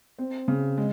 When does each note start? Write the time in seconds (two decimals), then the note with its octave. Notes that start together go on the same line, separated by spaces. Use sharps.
0.19 C4
0.48 C#3
0.78 G#3